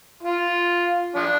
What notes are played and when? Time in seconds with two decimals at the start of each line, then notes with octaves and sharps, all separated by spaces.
0.23 F4
1.16 F3 D4